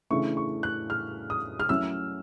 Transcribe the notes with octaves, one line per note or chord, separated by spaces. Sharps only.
C#3 E3 A3 D4 C#6
C#6
F#6
F6
D#6
F6
F#3 A3 C#4 E4 E6